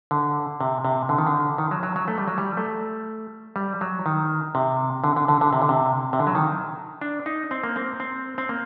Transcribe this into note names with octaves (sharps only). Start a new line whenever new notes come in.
D3
C3
C3
D3
D#3
D3
D#3
F#3
F#3
F#3
A3
G3
F#3
G3
A3
G3
F#3
D#3
C3
D3
D3
D3
D3
C3
D3
C3
C3
D3
F#3
D#3
D4
D#4
C4
A#3
C4
C4
C4
A#3